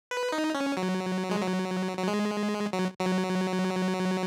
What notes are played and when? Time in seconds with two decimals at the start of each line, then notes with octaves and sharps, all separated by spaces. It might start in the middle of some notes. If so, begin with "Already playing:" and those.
0.11 B4
0.32 D#4
0.55 C#4
0.77 F#3
1.31 G#3
1.42 F#3
1.97 F#3
2.08 G#3
2.73 F#3
3.00 F#3